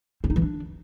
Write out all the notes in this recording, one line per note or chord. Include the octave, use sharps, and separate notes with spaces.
C4
D#4
E3
D4